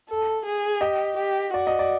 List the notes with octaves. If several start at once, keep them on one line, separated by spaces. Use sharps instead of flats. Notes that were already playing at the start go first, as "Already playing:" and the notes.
A4
G#4
G4 D#5
G4
F#4 D5
D#5
D5